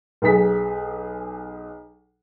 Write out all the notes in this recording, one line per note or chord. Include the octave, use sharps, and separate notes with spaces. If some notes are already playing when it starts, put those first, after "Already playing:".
B1 G#4 B6